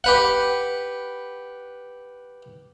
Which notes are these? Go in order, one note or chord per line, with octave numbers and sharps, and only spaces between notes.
G4 B4 F#5